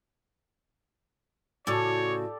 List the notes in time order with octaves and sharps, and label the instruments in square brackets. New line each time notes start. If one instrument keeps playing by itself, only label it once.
[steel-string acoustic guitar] A2 C#3 [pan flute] F#4 [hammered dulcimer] G4 A4 D5 [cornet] C#5